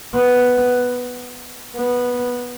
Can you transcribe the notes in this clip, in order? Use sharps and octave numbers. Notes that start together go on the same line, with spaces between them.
B3
B3